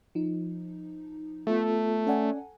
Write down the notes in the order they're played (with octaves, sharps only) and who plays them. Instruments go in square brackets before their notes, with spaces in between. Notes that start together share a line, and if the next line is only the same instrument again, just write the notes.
[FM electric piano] F3 D#4
[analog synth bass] A3 [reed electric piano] B3 F4 A4
[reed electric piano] C#4 D5 [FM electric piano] A4 F#5 G#5